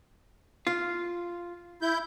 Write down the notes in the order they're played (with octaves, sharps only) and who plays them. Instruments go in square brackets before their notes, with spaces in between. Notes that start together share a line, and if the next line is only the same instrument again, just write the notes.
[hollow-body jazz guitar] F4
[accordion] E4 G6